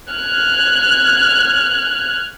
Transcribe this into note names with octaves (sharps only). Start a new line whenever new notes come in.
F6 F#6 G#6